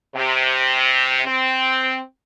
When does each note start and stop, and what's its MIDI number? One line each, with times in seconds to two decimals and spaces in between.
0.16 1.22 48
1.25 2.00 60